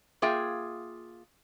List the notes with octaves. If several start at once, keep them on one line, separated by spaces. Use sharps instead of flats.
A#3 F4 G#4 E5 G5